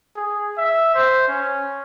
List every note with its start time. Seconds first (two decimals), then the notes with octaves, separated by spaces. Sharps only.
0.16 G#4
0.58 E5
0.94 C5
1.28 C#4